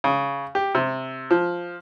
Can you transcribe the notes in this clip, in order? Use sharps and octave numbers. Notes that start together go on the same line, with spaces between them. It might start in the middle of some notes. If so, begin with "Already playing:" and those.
C#3
G4
C3
F3